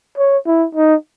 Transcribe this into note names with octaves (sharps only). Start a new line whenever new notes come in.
C#5
E4
D#4